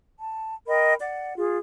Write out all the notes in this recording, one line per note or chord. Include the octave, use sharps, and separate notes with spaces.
A5
A#4 D#5 G5 B5
D5 F#5
F4 G#4